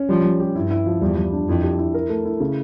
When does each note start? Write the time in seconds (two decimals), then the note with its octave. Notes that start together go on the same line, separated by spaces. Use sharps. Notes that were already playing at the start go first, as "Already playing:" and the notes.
Already playing: C#4
0.09 F3 G3
0.24 G3
0.40 G4
0.55 G2 E4
0.71 E4
0.86 F3
1.01 E2 G3
1.17 G3
1.32 D4
1.48 F2 E4
1.63 G4
1.79 E4
1.94 A#4
2.09 A3
2.25 E4
2.40 C#3